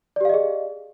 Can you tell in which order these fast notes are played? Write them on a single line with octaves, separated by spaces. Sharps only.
D5 G4 F5 D#5 G#4